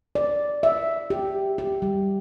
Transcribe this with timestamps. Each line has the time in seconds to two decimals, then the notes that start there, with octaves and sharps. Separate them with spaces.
0.15 D5
0.63 E5
1.10 G4
1.58 G4
1.82 G3